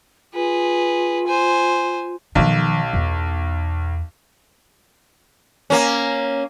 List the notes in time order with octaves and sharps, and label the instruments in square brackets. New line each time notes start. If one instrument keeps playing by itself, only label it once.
[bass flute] F4 [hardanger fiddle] G#4 B4
[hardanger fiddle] C5 G#5
[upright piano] B1 [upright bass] D#3 F3
[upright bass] E2
[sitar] A#3 C#4